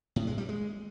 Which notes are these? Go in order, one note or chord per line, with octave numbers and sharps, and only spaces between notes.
A2
G#3
G3
G#3